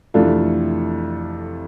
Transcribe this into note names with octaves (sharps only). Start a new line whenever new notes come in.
F2 C3 E3 A3 D4 F4 A4